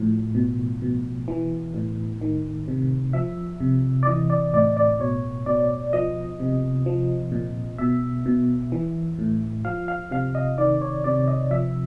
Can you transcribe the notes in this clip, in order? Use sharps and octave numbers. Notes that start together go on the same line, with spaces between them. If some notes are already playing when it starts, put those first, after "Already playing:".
Already playing: A2 F3
B2
B2
E3
A2
D#3
C3
F3 E5
C3
D5
E3 D#5
D5
A2 D5
D5
B2 C#5
B2 D5
F3 D#5
C3
F3
A#2
B2 E5
B2
E3
A2
F3 F5
F5
C3 F5
D#5
D#3 D5
C#5
C3 D5
D#5
F3 E5